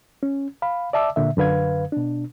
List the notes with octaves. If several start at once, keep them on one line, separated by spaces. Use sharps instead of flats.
C#4
F5 B5
D5 E5 A5 D6 E6
A#2 D3 E5
F#2 D3 B4 F5 G#6
B2 D4